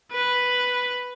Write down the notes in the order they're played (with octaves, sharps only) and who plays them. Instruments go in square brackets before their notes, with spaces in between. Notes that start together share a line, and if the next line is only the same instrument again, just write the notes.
[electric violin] B4